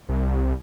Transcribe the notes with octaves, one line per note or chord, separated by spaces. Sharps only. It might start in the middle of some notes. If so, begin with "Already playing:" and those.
C2